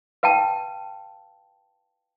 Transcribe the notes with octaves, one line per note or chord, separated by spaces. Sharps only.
B4 F5 G5 A5